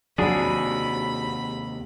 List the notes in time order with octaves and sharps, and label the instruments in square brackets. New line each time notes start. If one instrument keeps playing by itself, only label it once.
[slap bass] D#2 C3 [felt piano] F#3 [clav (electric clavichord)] D4 G#4 [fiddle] B5